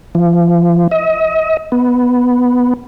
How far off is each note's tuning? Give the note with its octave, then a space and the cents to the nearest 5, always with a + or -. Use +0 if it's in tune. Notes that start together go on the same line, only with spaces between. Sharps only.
F3 -30
D#5 +40
B3 +0